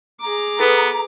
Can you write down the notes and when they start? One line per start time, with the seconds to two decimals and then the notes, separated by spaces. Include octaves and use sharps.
0.21 G#4 A#5 D6
0.60 B3 A4 B4